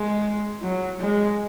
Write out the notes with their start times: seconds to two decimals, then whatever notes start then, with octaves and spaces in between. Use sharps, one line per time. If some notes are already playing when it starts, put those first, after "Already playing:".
Already playing: G#3
0.61 F#3
1.00 G#3